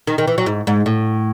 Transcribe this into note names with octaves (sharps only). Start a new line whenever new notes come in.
D#3
D#3
E3
F#3
G#2
G#2
A2